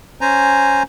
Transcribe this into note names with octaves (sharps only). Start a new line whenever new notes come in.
C#4 C5 G#5 A#5